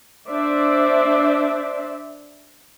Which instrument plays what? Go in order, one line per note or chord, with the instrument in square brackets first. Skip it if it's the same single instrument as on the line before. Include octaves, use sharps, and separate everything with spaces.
[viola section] D4 C5 D5 E5